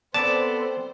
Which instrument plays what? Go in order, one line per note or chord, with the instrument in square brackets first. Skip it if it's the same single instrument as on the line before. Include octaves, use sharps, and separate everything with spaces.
[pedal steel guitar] B3 A4 [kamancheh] C4 C5 [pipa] D5 [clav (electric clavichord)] A5